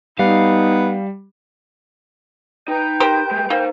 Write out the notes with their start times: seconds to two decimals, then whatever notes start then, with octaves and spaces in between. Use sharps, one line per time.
0.19 G3 B3 D#4 F5
2.68 D#4 B4 G5 A#5 G6
3.00 G4 A#4 C5
3.31 G#3 A3
3.50 A#3 D#4 C5